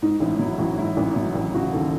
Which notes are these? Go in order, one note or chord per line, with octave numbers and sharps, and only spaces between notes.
G#2 D#4
A1 E4
F#3 E4
A1 F#4
G#2 E4
A1
F#3 E4
A1
C#3 F#4
D#2 A4